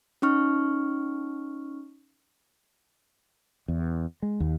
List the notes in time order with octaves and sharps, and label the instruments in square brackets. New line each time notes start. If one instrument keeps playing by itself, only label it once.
[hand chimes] C#4 D#4 C#6 F6
[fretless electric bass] E2
G#3
D#2